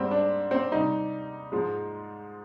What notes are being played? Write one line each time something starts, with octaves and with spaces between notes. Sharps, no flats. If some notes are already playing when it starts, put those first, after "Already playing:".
Already playing: G#2 G3 C4
D4
C4
C3 G3 D#4
G#2 F3 G#3